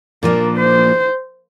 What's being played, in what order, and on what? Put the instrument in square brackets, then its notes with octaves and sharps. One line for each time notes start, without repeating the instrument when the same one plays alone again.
[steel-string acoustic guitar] A#2 F3 A#3 D4 [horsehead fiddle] A#4
[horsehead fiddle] C5